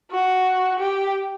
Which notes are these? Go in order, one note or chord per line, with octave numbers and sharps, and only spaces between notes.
F#4
G4